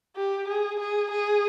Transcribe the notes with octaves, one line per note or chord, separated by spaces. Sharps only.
G4
G#4
G#4
G#4